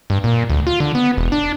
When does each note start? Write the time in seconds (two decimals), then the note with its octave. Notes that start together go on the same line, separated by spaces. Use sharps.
0.10 G2
0.24 A#2
0.50 D2
0.67 F4
0.80 D3
0.95 B3
1.18 E1
1.32 D4